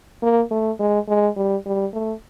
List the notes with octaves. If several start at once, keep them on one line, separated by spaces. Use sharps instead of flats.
A#3
A3
G#3
G#3
G3
G3
A3